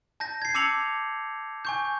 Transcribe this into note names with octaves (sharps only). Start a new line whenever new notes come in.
A5 G6 A#6
G#6 C7
A5 D6 E6 C#7 F7 F#7
G#5 C#6 G6